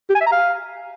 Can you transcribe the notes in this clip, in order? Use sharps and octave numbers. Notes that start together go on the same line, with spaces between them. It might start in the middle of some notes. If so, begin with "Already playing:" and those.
G4
G#5
E5
A#5
F5